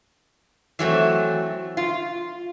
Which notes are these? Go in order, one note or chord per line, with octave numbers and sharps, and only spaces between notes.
E3 F#3 A3 C4
F4